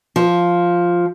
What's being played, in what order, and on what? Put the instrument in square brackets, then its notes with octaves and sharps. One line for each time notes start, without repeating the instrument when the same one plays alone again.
[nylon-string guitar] F3